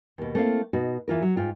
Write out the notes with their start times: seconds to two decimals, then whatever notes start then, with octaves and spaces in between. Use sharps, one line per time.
0.18 D#2 B2
0.35 A3 A#3 C4 E4 F5
0.73 B2 D#4 F#4
1.08 E2 E3 F4 A#4
1.22 F#3
1.36 G#2 F4 G5